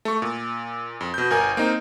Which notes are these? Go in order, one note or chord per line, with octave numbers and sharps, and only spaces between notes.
A3 C#6
A#2
F2
B2 G6
G1 A#4 G#5
A#3 C4 D#4